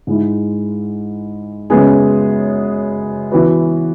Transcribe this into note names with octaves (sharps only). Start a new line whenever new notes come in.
G#2 G#3 E4
F#2 C#3 G#3 B3 G#4
E3 B3 F#4 B4